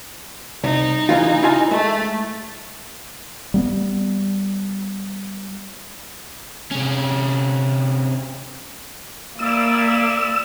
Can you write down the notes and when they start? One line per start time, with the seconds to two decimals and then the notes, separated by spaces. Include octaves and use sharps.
0.64 C2 D#4
1.09 C#3 E3 F4
1.43 E4 F4 G#5
1.71 G#3 A3
3.54 G3 A#3 B3
6.72 C3 C#4
9.39 C3 A#3 E4 D5 E6